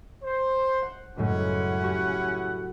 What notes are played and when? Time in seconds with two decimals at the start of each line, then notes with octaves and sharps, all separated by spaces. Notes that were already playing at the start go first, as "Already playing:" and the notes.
0.23 C5
0.82 F#5
1.17 C#2 F#2 A2 C#4 E4 F#5
1.53 C6
1.84 F#4 G4 C#6